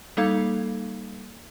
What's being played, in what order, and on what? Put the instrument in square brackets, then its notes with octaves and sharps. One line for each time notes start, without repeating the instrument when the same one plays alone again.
[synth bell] G3 A#3 D#4 A4 F5 G#6